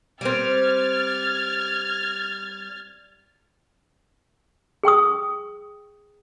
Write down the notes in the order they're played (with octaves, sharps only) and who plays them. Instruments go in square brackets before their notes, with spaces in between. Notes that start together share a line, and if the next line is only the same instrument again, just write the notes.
[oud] G3 C4 [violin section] F6 G#6 A6
[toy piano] G#4 G5 C#6 D#6